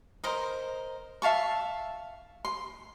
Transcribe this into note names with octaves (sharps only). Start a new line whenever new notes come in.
A#4 C5 D#5
E5 F5 A5 C#6
C6